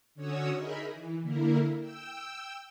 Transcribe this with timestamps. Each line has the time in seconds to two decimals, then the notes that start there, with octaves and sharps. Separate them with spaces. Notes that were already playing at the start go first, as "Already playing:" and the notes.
0.15 D3 C#4 F#4 C#5 D#6 E6
0.55 D#4 G#4 A#4 D#5 E5 B5
0.91 E3
1.22 D3 A#3 E4 A#4
1.79 G5 E6